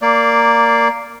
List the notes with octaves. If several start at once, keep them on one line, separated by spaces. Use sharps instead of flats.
A#3 D5